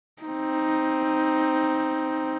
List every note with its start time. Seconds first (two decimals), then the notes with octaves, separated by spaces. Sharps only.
0.22 C4 D#4